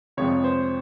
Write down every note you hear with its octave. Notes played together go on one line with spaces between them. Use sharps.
F2 C3 F3 G#3 C4 C#5
C5